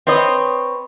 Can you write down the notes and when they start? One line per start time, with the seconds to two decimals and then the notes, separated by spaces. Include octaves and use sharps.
0.07 C4 B4 C#5 D#5